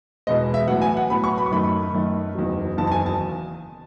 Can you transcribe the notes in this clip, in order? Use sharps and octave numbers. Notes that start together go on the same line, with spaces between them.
E2 B2 G#3 B3 D#5
E5
A2 F#3 B3 F#5
G#5
F#5
A2 F#3 B3 B5
C#6
B5
C#6
F#2 D#3 A3 B5
F#2 D#3 A3
F#1 E2 D#3 F#3
F#1 E2 D#3 F#3 A5
A5
G#5
A5